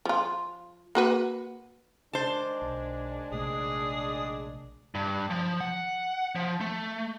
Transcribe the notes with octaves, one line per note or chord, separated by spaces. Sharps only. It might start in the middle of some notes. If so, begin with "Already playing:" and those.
F3 F4
A#3 F#4 B4
D#3 G#3 D4 C5 A5
B1
A#1 C3 A3 G#4
G2
F3
F#5
F3
A3